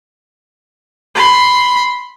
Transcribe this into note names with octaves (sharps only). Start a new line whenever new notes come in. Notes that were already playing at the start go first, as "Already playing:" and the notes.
B5 C6